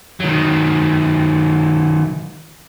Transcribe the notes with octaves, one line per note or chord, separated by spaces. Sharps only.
D#3 F#3